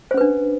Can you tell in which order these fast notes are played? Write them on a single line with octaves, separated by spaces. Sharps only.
C5 C#4 B4 D4